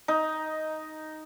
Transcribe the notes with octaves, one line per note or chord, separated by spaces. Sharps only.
D#4